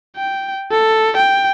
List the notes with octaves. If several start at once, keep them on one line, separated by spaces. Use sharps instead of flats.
G5
A4
G5